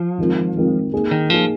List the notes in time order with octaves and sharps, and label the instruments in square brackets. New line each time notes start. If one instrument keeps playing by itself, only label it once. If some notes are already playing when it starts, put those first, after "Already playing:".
Already playing: [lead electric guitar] F3
[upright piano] D#3 G#3 C4 F4 A#4
D#3 G#3 C4 F4 A#4
A#3 D#4 G#4
[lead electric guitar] D#3
[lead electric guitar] F3 [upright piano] A#3 D#4 G#4